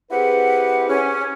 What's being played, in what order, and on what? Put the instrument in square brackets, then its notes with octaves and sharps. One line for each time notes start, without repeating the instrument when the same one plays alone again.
[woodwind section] C4 E4 G4 G#4 B4 F#5
C#4